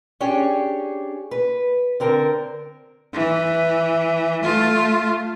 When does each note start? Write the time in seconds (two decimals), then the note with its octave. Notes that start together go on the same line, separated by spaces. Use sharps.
0.20 C#4 D4 G4 G#4 C#5
1.31 B4
2.00 D3 C4 A#4
3.13 E3
4.42 A3 F4